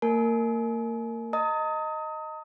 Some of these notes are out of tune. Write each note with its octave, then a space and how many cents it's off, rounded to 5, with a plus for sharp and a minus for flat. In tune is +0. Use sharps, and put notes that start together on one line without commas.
A#3 -35 A#4 -15 G#5 +40
D#5 +0 A#5 -40 D#6 +25